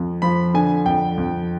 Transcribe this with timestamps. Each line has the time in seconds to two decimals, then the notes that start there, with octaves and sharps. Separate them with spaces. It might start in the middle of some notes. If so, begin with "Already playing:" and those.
Already playing: F2
0.22 F3 B5
0.54 D3 G#5
0.86 F2 G5
1.18 F2